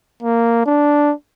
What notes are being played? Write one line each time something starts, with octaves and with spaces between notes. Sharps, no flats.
A#3
D4